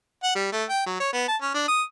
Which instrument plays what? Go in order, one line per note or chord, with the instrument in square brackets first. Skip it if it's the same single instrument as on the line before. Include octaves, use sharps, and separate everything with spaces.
[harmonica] F#5
G3
A3
G5
F#3
C#5
B3
A5
C#4
D4
D#6